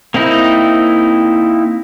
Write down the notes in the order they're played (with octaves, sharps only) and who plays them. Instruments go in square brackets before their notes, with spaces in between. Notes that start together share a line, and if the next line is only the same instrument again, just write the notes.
[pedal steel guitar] A#3 C4 D#4 E4